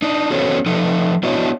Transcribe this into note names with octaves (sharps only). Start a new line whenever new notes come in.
D4 D#4
B3 C#4 F#4 A4 C5 C#5
F3 D#4 A4 D#5
B3 D4 E4 F#4 C#5 D#5